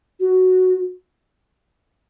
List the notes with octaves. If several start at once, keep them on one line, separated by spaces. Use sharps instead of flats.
F#4